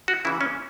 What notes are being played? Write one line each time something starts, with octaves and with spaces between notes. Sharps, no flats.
F#4
C#3 E3 E4
C#4